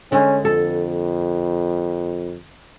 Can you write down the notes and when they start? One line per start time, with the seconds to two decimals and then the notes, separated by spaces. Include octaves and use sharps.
0.12 D3 G#3 C#4
0.45 F2 A4